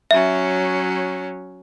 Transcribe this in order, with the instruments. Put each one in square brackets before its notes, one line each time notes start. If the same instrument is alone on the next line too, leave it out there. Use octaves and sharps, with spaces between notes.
[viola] F#3 C#4 [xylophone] E5